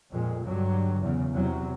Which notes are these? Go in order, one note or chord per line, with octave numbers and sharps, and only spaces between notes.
F2 A#2 G#3
G2 D3 F#3
E2 C#3
E2 C3 F#3